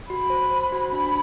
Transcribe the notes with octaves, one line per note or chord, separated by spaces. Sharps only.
F#4 B5
C5
C5
F#4
D4 B5